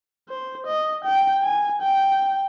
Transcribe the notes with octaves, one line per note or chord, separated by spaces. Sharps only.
C5
D#5
G5
G#5
G5